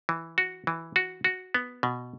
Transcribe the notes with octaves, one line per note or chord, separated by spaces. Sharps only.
E3
F#4
E3
F#4
F#4
B3
B2